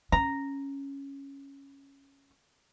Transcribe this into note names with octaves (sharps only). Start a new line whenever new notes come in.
C#4 A#5